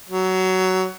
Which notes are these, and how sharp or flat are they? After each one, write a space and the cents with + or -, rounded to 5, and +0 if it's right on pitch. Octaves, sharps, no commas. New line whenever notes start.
F#3 +15